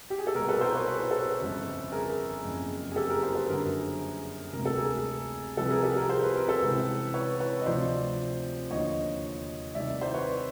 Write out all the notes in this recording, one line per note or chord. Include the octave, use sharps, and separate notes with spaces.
G4
G#4
A4
C2 B2 G#4 A#4
A4 B4
A#4 C5
B4 C#5
B4
C5
A4 B4
G1 F2 C#3
G#4 A#4
F#1 F2 C#3
G#4
G4 A4
G#4 A#4
A#4 C5
A4 B4
G1 F#2 D3 G#4 A#4
E1 D2 C3 A#4
A4
G#4 A#4
C2 C3 F3 A4 B4
G#4 A#4
G4 A4
G#4 A#4
C5
B4
A#4
A4 B4
C#2 C3 E3
B4 C#5
B4 C#5
D#5
D2 C3 F3 C5 D5
D#2 D3 F3 C#5 D#5
C2 C3 D#3 D5 E5
C5 D5
B4 C#5